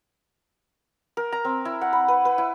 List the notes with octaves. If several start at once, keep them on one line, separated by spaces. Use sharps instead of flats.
A#4
A#5
C4
E4
F#5
B5
B4
B4
E4